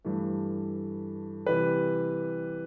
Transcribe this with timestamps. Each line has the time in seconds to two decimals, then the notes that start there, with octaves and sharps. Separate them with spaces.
0.04 G2 E3 A3
1.46 C3 E3 G3 B4